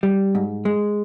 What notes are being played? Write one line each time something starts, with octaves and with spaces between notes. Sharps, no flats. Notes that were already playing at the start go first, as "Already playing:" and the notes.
G3
G#2
G#3